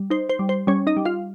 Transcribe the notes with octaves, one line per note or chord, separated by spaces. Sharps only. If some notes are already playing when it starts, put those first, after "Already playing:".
Already playing: G3
D#4 C5
C5
G3
C5
G3 C#4 C#5
D#4 D#5
G3
F4 F5